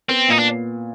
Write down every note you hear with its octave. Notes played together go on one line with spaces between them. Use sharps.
B3 C4
A#2 D#4
D4